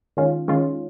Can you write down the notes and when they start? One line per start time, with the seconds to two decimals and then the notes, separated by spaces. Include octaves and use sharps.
0.17 D#3 G#3 C#4 F4
0.48 D#3 G#3 C#4 F4